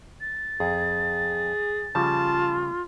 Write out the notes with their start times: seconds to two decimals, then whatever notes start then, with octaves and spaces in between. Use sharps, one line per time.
0.21 A6
0.60 F2 G#4
1.95 C#3 F3 G3 F4 A5